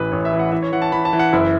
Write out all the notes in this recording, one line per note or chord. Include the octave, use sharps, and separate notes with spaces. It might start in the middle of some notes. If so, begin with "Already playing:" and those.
Already playing: A1 E3 B4
A1 C#5
E5
E3
F#5
E3 E5
C#5
E3 F#5
A5
E3 B5
A5
E3
F#5
F#1 E4